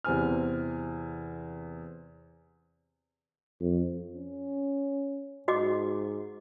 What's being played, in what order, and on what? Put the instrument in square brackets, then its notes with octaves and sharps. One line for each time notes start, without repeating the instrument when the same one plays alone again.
[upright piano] E2 C3 C4 G#5 F6
[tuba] F2
[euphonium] C#4
[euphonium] G#2 [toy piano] F#4 D#5 D6